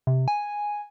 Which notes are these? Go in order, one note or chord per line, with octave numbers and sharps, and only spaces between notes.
C3
G#5